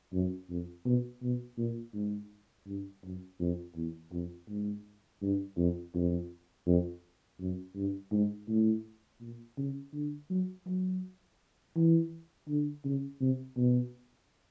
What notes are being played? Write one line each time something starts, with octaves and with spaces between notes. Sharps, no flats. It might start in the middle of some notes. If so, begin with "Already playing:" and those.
F#2
F2
B2
B2
A#2
G#2
G2
F#2
F2
E2
F2
G#2
G2
F2
F2
F2
F#2
G2
G#2
A2
A#2
C#3
D3
F#3
F#3
E3
D3
C#3
C3
B2